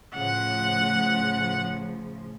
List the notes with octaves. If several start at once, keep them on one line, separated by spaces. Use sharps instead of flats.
A2 C#3 F3 F#5